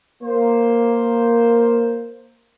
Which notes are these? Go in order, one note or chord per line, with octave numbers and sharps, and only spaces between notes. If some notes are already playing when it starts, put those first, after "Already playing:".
A#3 C5